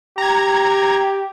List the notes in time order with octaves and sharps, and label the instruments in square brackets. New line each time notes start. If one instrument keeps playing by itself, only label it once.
[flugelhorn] G4 [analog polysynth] A#5 G#6